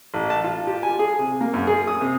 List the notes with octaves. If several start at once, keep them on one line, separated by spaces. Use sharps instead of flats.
A1
A5
F4
G4
G#5
G#4
C3
A#3
F#2
G#4
D#6
C3